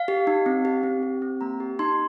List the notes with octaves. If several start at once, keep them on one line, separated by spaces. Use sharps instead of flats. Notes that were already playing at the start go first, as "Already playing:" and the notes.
Already playing: F5
G4
D#4
C4
G4
C4
G4
C4
A#3 A#5
G4
D#4 C6